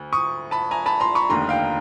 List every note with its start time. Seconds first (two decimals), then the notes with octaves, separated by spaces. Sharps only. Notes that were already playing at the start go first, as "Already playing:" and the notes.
Already playing: D2
0.13 C#6 D#6
0.51 A5 B5
0.71 G#5 A#5
0.86 A5 B5
1.00 A#5 C6
1.15 B5 C#6
1.29 F1 D#2 D3 A#5 C6
1.49 F5 G5